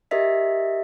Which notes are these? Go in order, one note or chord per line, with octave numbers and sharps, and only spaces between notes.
G4 A#4 D#5 E5 B6